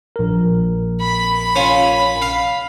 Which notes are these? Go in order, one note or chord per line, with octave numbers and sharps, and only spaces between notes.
A#1 A#4
B5
C#4 F4
F5